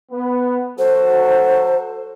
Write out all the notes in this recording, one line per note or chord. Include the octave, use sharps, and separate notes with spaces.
B3
F#3 F#4 A4 C5